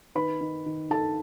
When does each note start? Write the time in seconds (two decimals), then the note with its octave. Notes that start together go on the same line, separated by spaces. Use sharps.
0.15 D#3 B4 B5
0.41 D#3
0.66 D#3
0.90 D#3 A4 A5